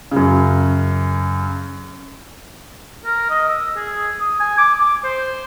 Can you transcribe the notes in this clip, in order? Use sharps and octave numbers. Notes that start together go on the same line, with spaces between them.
F#2 C#3
A#4
D#5
E6
G#4
D#6
G#5
D6
D6
C5